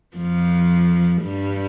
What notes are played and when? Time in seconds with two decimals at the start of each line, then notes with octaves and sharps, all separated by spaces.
0.17 F2 F3
1.22 G2 G3